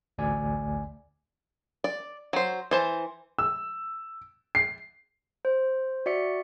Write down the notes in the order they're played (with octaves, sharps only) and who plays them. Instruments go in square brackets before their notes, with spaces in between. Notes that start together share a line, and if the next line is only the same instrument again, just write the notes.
[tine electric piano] A1 D2 D5 G#5
[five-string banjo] D5
F#3 C5
E3 C5 A5
[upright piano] E6
C7
[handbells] C5
F#4 D5 E5 C#7